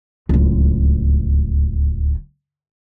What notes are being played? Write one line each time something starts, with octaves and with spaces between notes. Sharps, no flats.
D1 C#2